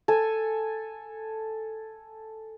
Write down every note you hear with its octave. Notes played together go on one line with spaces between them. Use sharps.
A4 G#5